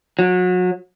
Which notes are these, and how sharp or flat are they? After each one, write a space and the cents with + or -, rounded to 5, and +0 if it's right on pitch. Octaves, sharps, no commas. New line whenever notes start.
F#3 -30